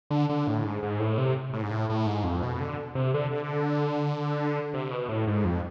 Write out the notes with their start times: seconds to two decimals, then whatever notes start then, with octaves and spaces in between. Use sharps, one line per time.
0.10 D3
0.29 D3
0.47 A2
0.65 G#2
0.83 G#2
1.00 A2
1.18 C3
1.53 A2
1.62 G#2
1.71 A2
1.90 A2
2.07 G#2
2.24 F2
2.43 B2
2.60 D3
2.95 C3
3.14 D3
3.31 D3
4.74 C3
4.91 B2
5.09 A2
5.27 G#2
5.45 F2